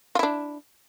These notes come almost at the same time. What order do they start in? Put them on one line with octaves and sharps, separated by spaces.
F4 E4 D4